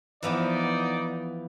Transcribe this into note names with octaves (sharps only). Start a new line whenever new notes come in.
E3 F3 B3 D#4 D5